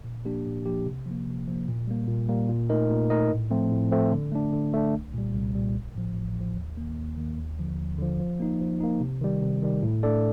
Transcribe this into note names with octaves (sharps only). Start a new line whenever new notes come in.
A#2
F3 A#3 D4 G4
A#2
F3 A#3 D4 G4
C3
F3 A#3
C3
F3 A#3
A#2
G3 A#3
A#2
G3 A#3
A#2
A3 D#4 A#4 D#5
A#2
A3 D#4 A#4 D#5
A2
F3 A3 C4
A2
F3 A3 C4
D3
A3 D4
D3
A3 D4
C2
A#2 G3
C2
A#2 G3
A1
A2 F3
A1
A2 F3
D#2
D#3 A#3
D#2
D#3 A#3
D#2
D3 F3
D#2
D3 F3
F3
A#3 D#4
F3
A#3 D#4
C3
D#3 G3
C3
D#3 G3
A2
A3 D4 A4 D5